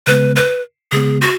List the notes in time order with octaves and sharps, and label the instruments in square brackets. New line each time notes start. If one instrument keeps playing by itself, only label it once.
[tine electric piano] C#3 G#3 B3 [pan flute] B4
[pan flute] B4
[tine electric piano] C#3 G#3 B3 [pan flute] G#4
[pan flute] F#4